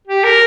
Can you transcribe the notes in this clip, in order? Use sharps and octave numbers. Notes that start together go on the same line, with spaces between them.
G4
A#4